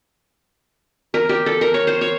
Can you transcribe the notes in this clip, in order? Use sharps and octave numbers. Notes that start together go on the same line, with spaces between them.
A#4
G4
A4
A#4
C#5
C5
C#5